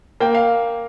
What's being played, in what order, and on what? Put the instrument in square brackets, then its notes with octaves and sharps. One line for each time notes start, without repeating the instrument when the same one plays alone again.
[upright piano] A#3 [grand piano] G5
[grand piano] F5